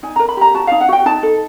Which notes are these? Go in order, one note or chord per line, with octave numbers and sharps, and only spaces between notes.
D#4 G#5
A#4 A#5
B5
G4 A#5
F#4 A5
D#4 F5
F#5
F#4 G5
D#4 A5
A4